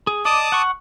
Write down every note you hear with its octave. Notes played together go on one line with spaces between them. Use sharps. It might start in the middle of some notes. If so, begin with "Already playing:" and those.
G#4
D5 D#5 A5 D6 D#6
F#5 C#6